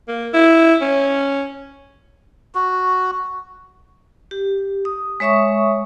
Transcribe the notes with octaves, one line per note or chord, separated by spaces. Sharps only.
A#3
E4
C#4
F#4
G4
D#6
G#3 C#5 E5 C#6 D#6